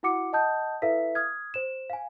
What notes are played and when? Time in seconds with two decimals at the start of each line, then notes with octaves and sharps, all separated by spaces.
0.03 E4 F#4 F#5 D6 C#7
0.33 D#5 F#5 A5 D#6 G6
0.82 E4 A4 B4 E5 F5 B6
1.15 D#6 F6 G#6
1.54 C5 E7
1.90 F5 G#5